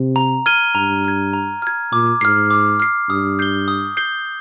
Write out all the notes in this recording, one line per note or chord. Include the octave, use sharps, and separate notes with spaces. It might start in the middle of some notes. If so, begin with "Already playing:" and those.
Already playing: C3
A#5
F6 G#6 D#7 G7
G2 A#5
F6 G#6
A#5
F6 G#6
A#2 D6
G#2 F6 C7
D6
F6 C7
G2 D#6
G6 C7 G7
D#6
G6 C7 G7